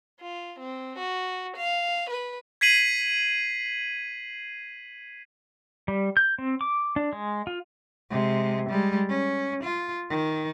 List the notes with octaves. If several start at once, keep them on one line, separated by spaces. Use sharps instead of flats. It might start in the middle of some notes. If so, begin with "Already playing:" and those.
F4
C4
F#4
F5
B4
G#6 B6 C7 D#7 F#7
G3
G6
C4
D6
D4
G#3
F4
C3 G#3
G3 G#3
C#4
F4
D#3